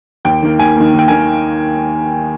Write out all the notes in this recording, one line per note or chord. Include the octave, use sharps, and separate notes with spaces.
D#2 G5
D#3 A#3
D#2 G#5
D#3 A#3
D#2
G5
D#3 A#3 G#5